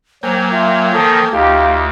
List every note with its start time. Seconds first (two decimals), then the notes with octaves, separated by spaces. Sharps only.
0.23 F#3 A#3 C5 G5 G#5
0.52 F4 E5
0.93 D#3 F3 A4 D#6
1.32 D2 D#4 F4 G4 F5